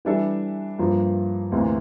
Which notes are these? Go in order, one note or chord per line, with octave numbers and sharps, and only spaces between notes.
E3 G3 D4 A4 E5
G2 F3 A#3 F4
D2 C3 E3 A#3